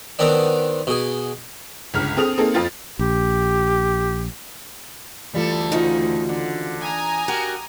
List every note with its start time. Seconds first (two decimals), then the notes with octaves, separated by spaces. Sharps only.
0.19 D#3 B3 C4 D4
0.87 B2 G#4
1.94 G1 C#2 F6
2.17 C4 G#4 A4 D#6 F7
2.38 A#3 C4 D#4 G#4 A4
2.54 F2 C4 F4 A6
2.99 A#1 G4
5.35 D2 E3 G3 F4 A4
5.72 C#3 F3 D#4 F#4
6.29 D3
6.82 G#5 A#5 D#6
7.28 F#4 G4 A#4